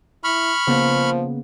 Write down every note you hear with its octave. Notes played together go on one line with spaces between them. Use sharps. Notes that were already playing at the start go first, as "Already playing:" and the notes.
E4 B5 C#6 F6
C#3 F3 A#3 B3